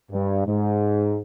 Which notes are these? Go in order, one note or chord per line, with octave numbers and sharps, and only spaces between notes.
G2
G#2